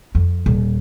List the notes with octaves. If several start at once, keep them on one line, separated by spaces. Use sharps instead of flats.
F2
D#1